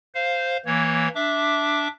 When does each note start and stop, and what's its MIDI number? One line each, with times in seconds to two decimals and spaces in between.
0.15 0.57 72
0.15 0.57 77
0.66 1.08 52
0.66 1.08 58
0.66 1.08 73
1.15 1.88 62
1.15 1.88 76
1.15 1.88 86